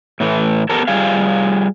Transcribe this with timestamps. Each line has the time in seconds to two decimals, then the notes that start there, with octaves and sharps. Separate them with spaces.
0.20 A2 E3 A3
0.69 B3 G4 A4 A#4
0.88 G3 F4 G#4 F5